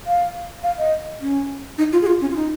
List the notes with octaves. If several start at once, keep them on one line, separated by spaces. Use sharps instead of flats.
F5
F5
D#5
C#4
D#4
F4
G#4
F4
C#4
F4
D#4